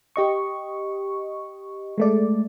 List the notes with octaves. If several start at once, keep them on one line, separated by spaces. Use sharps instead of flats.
G4 D#5 C#6
G#3 A3 D5